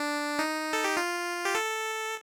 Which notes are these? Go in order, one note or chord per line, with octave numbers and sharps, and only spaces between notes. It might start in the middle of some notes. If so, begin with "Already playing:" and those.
Already playing: D4
D#4
A4
G4
F4
G4
A4